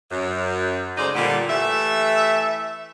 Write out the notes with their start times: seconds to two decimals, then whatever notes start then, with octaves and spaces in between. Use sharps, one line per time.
0.11 F#2
0.97 C#3 G#3 A3 D#4 C5 D5
1.15 A#2 D3 G3
1.49 E3 A3 G4 E5